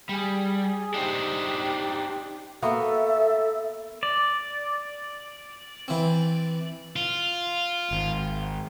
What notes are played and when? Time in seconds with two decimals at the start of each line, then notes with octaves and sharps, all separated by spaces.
0.09 G3 G#4
0.94 D4 D#4 G4 C5
2.62 A#3 B3 F#4 A4 E5
4.03 D5
5.88 E3 C4
6.96 F4
7.91 G#1